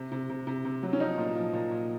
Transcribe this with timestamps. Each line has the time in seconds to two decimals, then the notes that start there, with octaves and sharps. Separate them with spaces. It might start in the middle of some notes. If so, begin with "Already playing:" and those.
Already playing: C3
0.12 C3
0.29 C3
0.47 C3
0.65 C3
0.83 F#3
0.93 C#4
1.00 F3 D#4
1.18 A#2
1.36 F3
1.53 A#2
1.71 A#2